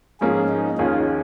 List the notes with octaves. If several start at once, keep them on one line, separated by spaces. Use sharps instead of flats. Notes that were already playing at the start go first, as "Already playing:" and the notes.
G#2 F3 A#3 C#4 G#4
D#4
D#2 D#3 C#4 F4 G#4